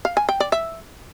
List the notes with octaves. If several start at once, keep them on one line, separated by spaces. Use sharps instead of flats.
F5
G#5
G5
D5
E5